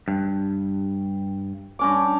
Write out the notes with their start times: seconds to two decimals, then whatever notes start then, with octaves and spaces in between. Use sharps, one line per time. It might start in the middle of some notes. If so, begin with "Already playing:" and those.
0.08 G2
1.79 G2 C#4 D6